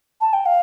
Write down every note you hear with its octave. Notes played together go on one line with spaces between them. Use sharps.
A5
G5
F5